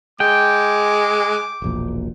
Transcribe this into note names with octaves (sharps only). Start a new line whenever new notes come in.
G#3 G5 D6
E1 A#1 A#2